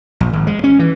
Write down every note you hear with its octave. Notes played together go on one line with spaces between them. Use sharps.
A#1
G#1
G#3
C#4
E3